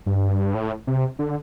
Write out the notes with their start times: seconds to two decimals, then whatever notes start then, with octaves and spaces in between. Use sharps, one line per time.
0.06 G2
0.55 A2
0.87 C3
1.19 D3